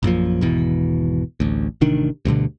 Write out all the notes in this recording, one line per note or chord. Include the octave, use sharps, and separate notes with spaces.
A#1 F#2 A#2 F3
G#1 E2 B2 E3
A1 D2
A1 C3 D#3 D4
D2 G2 B2 D3